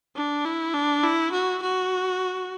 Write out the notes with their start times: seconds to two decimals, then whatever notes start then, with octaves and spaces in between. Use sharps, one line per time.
0.16 D4
0.45 E4
0.74 D4
1.03 E4
1.32 F#4
1.62 F#4